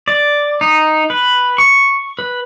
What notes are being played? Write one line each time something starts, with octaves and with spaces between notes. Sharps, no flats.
D5
D#4
B4
C#6
B4